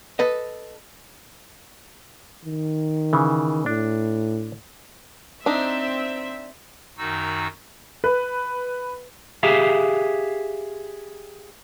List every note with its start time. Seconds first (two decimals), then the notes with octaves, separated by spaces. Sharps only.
0.19 A4 B4 D#5
2.45 D#3
3.13 C#3 E3
3.66 A2 D4
5.46 C4 D4 D#4 E5
6.97 F#2 D#3 D#4 F#4 E6
8.04 B4
9.43 G4 G#4 E5 F5